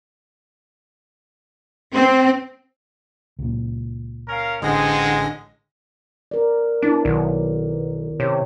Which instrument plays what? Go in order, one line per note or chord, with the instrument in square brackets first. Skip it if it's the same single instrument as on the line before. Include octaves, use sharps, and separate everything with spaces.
[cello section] C4
[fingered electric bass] C#2 A#2
[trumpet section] C#4 A#4 F5
[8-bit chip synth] A1 D3 A#6 [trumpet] G#3 [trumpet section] C4 G#4 F#5
[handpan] A#4 D5
[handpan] B3 E4 D5 [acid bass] D4
[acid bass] B1 [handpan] D#3
[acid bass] C3 [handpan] C#5